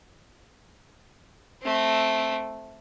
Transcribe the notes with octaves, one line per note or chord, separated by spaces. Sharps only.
A3 C4